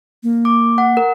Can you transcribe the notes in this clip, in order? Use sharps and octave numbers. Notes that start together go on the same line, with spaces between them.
A#3
D6
F#5
A#4